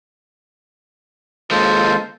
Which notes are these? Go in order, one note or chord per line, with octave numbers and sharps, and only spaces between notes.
D#2 G#3 F4 A4 C5